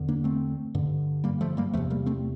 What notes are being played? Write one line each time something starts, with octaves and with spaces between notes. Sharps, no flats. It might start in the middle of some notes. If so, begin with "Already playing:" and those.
Already playing: E2 D3
A#3 D4
A3 C4
G2 D3
G3 A#3
F3 A3
G3 A#3
E2 C3 F3 A3
G3 A#3
A3 C4